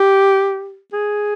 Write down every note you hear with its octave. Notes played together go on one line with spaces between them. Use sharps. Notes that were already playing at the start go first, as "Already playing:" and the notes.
Already playing: G4
G#4